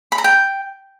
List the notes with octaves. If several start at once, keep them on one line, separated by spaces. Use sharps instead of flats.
B5
A#5
G5